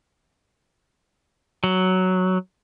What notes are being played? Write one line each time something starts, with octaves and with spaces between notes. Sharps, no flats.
F#3